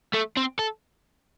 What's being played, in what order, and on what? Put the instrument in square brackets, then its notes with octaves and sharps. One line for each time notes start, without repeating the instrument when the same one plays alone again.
[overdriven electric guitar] A3
C4
A4